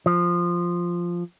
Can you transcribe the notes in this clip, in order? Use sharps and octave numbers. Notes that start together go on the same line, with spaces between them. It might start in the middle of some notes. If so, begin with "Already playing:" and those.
F3